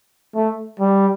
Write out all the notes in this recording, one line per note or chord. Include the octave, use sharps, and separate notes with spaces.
A3
G3